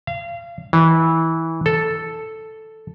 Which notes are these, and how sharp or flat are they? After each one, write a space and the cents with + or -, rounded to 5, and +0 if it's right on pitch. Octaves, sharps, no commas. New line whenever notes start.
F5 -30
E3 -20
A4 +0